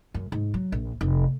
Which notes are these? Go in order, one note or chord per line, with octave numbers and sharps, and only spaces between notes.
F#2
G#2
F#3
A#1
F1